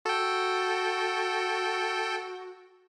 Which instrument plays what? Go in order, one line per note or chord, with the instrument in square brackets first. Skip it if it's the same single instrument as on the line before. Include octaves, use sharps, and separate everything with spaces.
[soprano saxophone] F#4 [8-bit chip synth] A4 G5